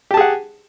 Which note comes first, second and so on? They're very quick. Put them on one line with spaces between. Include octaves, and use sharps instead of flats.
G4 A5 G#4 F#5